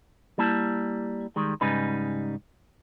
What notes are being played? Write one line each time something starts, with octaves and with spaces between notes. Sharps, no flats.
G3 A#3 E4 A5
D#3 G3 G#3
G#2 C#3 G3 D#4 B4